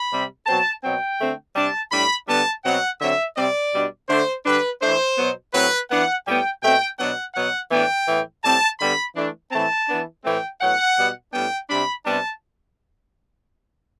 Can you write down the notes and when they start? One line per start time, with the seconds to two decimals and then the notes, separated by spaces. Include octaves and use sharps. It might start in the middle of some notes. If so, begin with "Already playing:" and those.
Already playing: B5
0.10 C3 G3 C4
0.46 B2 F#3 C4 A5
0.83 B2 F#3 C4 G5
1.19 D3 A3 C4
1.55 C3 G3 D4 A5
1.91 A2 G3 D4 B5
2.28 D3 G3 B3 D4 A5
2.64 B2 F#3 C4 F#5
3.00 D3 F#3 C4 E5
3.36 C3 G3 C4 D5
3.72 B2 G3 D4
4.09 D3 A3 D4 C5
4.45 D3 G3 D4 B4
4.81 E3 A3 D4 C5
5.17 B2 F#3 B3
5.54 A2 F#3 C4 B4
5.89 E3 B3 D4 F#5
6.26 A2 G3 B3 G5
6.62 B2 A3 C4 G5
6.98 B2 F#3 B3 D4 F#5
7.34 B2 F#3 B3 F#5
7.70 A2 E3 B3 D4 G5
8.07 A2 E3 B3
8.43 A2 G3 C4 A5
8.80 D3 G3 B3 B5
9.15 E3 A3 D4
9.51 A2 E3 A3 C4 A5
9.88 E3 B3 D4
10.24 A2 E3 A3 C4 G5
10.60 A2 F#3 B3 F#5
10.97 B2 G3 B3
11.32 A2 G3 B3 D4 G5
11.69 C3 G3 D4 B5
12.04 C3 G3 B3 D4 A5